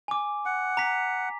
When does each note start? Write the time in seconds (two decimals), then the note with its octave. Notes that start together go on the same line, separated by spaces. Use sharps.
0.08 G#5 D6
0.46 F#5
0.77 A#5 B6